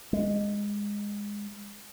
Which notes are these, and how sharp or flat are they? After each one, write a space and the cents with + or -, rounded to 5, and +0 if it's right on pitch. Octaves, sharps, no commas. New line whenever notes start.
G#3 -15